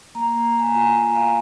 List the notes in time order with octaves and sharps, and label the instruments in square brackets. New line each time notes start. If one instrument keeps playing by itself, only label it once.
[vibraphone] A#3 A#5
A#3
A#5
A#3 G#5
A#5
F4 G#5
A#3 G#5
F4 F5